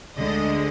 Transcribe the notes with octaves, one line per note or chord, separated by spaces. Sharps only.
D2 D3 G#3 D#5